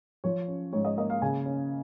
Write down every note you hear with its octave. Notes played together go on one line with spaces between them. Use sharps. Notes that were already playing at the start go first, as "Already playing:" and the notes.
F3 C#5
C#4
G#2 C#5
D#5
A#3 D#5
F5
C#3 G#5
C#4